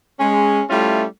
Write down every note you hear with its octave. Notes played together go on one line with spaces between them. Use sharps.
G#3 C#4
G3 A3 C#4 E4 F4